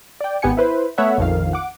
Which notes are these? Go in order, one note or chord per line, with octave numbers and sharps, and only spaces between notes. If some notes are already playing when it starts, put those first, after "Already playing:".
D5 G5
G#1 B3 G4 F#5 G#5 C#7
E4 B4 C5
A3 B3 C#5 E5 F#5
A#1 F2 D#3 F5
F#5 D6